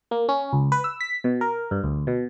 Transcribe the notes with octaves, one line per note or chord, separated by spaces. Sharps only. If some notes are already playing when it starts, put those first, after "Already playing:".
A#3
C#4
C#2
B4
E6
B6
B2
A#4
G2
D2
B2